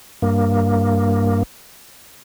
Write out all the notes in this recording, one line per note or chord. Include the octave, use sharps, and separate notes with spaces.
G2 A#3